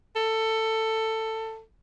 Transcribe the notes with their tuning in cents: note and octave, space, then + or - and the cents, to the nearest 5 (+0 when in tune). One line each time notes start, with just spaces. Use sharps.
A4 +15